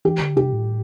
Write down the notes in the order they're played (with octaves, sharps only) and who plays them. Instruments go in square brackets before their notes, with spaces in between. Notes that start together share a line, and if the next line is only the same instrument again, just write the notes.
[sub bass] E3 [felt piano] G4
[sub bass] D3
[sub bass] C3 [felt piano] G4
[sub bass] A2